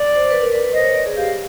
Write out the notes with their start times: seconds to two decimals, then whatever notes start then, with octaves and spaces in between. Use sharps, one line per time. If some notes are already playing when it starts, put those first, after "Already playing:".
Already playing: D5
0.15 C5
0.30 B4
0.41 A#4
0.52 B4
0.63 B4
0.73 C5 D#5
0.84 C#5
0.95 D5
1.06 G#4
1.17 G4 F5